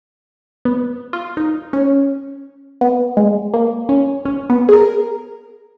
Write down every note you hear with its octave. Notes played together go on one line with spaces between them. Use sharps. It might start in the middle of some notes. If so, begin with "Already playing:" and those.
B3
F4
D#4
C#4
B3
G#3
A#3
C#4
C#4
B3
G#4
A#4